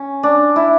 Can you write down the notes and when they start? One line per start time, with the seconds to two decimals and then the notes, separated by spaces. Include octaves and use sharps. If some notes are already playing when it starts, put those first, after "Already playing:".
Already playing: C#4
0.23 D4
0.56 E4